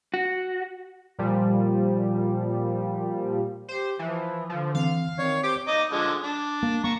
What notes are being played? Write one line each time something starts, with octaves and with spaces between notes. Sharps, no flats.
F#4
A#2 F3 G3
G4 C5
E3 F3
D3 F3
E3 C4 F5
D#3 C4 C#5 D5
G4 C5 D6
D#4 D#5 D6
D3 F3 G#3
D4
A#3
A#3 A#5 C#6